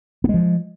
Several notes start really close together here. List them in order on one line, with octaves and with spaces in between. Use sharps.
B3 G#3 F3